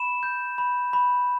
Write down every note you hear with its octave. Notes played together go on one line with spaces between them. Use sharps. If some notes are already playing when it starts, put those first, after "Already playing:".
Already playing: B5 E7
G6
B5
B5